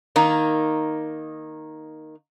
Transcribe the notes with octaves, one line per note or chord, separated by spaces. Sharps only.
D#3 A#3 D#4